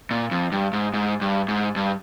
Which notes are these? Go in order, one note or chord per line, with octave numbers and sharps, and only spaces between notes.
A#2
F2
G2
G#2
G#2
G2
G#2
G2